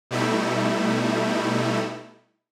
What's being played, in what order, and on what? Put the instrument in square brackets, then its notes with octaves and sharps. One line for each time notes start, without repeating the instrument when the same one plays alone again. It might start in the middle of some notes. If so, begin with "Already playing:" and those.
[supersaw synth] B2 G3 A3 D#4 E4